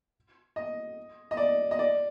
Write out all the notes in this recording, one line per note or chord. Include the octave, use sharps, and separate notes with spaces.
D#5
D#5
D5
D#5
D5